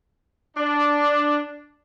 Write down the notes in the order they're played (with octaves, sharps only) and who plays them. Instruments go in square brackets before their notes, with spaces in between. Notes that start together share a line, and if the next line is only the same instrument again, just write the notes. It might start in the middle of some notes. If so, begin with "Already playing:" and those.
[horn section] D4